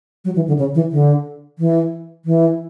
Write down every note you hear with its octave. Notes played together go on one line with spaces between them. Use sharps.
F#3
E3
D3
C#3
E3
D3
E3
E3